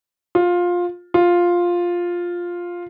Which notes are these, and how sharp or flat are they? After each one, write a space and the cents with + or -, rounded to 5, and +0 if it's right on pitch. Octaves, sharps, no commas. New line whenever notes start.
F4 +15
F4 +5